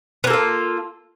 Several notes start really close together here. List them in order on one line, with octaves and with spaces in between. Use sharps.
B3 A#3 A4 F4